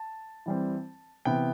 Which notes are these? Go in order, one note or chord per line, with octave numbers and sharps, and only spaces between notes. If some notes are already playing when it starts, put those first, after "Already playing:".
Already playing: A5
E3 G3 C4
C3 E3 B3 G5